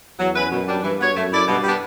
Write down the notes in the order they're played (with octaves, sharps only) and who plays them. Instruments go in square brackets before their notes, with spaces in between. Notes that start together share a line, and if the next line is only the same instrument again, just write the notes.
[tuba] E2 [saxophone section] F#3
[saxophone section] C#4 E4 B4
[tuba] F#2 [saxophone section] B2
[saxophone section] G3 D4
[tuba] G2 [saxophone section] E3
[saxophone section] B3 F#4 C#5
[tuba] F#2 [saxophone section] A3
[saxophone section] E4 A4 D5
[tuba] G2 [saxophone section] B2
[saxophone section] G3 B3 D4